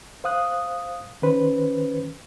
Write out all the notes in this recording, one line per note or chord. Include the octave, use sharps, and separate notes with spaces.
C5 F5 D#6 F#6
D#3 C#4 B4 C5